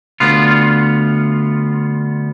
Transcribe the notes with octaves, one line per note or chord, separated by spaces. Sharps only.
D2 B3 F4